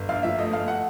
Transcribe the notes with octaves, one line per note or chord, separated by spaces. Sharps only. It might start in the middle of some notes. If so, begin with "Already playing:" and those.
Already playing: G1
A#1 F5
F3 E5
A3 D#5
A3 F5
F#5